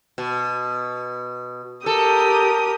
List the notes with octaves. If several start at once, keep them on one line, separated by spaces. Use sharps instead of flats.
B2
G4 A4 A#4 D#6